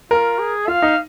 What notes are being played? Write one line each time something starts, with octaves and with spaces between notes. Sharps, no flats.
F4 A#4
G#4
F4 F5
D#4